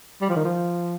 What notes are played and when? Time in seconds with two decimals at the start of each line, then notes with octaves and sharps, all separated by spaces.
0.21 G3
0.29 F3
0.36 D#3
0.45 F3